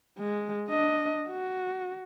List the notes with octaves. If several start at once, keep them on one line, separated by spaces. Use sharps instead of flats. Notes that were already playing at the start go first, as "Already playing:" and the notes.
G#3
D4 D#5
F#4